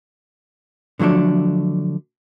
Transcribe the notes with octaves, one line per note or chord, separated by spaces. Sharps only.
D3 F3 F#3 A3 D4